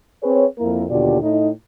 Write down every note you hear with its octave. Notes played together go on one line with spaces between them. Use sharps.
C4 G#4 B4 C#5
F2 A#3 E4 A#4
D#2 B2 D3 F4 G4 D5
A2 D#4